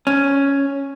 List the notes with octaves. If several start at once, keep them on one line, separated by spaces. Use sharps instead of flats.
C#4